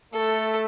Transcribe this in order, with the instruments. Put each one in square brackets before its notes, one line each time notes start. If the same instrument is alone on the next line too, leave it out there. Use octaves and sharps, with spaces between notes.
[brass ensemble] A3 [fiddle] A4